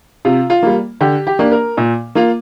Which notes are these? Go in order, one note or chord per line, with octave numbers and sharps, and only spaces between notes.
C3 F4
F4
G3 A#3
D3 G4
G4
A#3 D4
A#4
A#2
A#3 F4